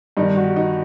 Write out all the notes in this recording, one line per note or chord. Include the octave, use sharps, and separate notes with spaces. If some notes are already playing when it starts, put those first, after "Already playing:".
G2 D#3 D#4
F#4
D#4